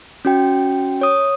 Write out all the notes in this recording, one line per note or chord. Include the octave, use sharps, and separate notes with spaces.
C#4 F#4 G5
C#5 D#6